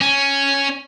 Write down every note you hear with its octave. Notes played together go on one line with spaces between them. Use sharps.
C#4